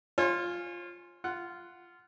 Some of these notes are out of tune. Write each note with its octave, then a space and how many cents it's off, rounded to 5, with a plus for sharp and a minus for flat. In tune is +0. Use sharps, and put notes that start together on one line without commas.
F4 +0 C#5 -40 G#5 +0
F4 -10 F#5 +0